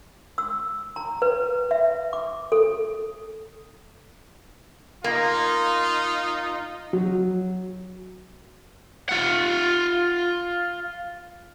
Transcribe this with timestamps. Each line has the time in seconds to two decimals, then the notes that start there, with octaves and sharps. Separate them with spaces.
0.38 E6
0.96 A#5
1.22 B4
1.71 E5
2.13 D6
2.52 A4
5.04 A#3 D#4 F4
6.93 F#3
9.09 F4 F#5